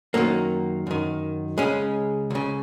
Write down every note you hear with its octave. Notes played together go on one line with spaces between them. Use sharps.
F#2 D#3 F#3 A#3
F#2 D#3
C#2 C#3 G#3 C#4
C#2 C#3